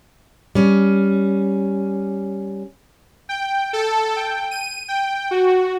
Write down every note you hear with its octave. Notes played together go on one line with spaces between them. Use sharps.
G3 C#4
G5
A4
G5
D#7
G5
F#4